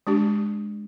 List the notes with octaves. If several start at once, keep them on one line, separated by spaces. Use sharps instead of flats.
G#3 D4 G4